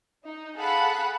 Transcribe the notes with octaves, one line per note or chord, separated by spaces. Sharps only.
D#4
G#4 A4 F5 F#5 B5 F#6